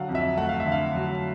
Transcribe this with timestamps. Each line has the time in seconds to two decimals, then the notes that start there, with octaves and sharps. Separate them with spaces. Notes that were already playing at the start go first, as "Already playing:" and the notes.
Already playing: D3 F#3 F5 F#5
0.09 F2
0.15 E5
0.37 A3 F#5
0.49 F5
0.60 E5
0.66 D3
0.72 F5
0.95 F#3